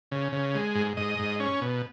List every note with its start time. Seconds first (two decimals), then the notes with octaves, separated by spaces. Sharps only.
0.11 C#3
0.32 C#3
0.55 G#3
0.75 G#2
0.97 G#2 D#5
1.19 G#2
1.40 C#4
1.61 B2